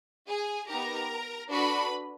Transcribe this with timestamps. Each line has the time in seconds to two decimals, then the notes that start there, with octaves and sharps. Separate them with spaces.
0.27 G#4 G#5
0.68 B3 D#4 G4 A#4 A#5
1.50 D4 F#4 A4 B4 B5